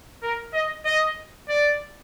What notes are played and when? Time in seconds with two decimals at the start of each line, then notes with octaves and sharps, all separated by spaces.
0.23 A#4
0.54 D#5
0.85 D#5
1.49 D5